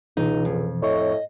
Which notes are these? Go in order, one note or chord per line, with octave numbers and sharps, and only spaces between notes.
C#2 B2 E3 D#4
F2
A2 C#5 D#5 C#6